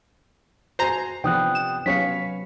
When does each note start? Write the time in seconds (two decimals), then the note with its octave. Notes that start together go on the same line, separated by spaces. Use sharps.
0.79 F#4 C5 G#5 A#5 C7
1.24 C3 F3 B3 D4 G5 D#6 F#6
1.55 E7
1.86 F#3 B3 C#4 C#5 F5 B6 C#7